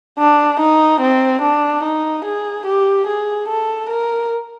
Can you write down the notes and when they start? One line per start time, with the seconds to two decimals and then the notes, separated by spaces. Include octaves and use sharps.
0.18 D4
0.60 D#4
1.01 C4
1.42 D4
1.84 D#4
2.25 G#4
2.66 G4
3.07 G#4
3.48 A4
3.90 A#4